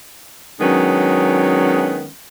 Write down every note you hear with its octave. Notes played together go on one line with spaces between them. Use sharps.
D#3 F#3 G#3 B3 C#4 D4